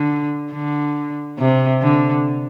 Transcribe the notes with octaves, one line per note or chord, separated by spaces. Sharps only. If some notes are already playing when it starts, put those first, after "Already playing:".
Already playing: D3
D3
C3
D3